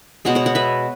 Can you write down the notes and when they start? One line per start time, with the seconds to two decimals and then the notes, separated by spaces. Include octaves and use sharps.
0.25 B2 G#3 B3 C#5 F#5
0.35 C#5 F#5
0.46 C#5 F#5
0.55 B4 E5